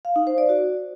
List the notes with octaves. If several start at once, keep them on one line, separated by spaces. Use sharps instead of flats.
F5
D#4
C5
D5
F#4